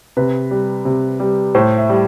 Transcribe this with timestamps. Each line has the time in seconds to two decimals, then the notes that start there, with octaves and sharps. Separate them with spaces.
0.17 C3 B4
0.51 G3
0.85 C3
1.20 G3
1.55 A2 C5
1.77 E5
1.89 G3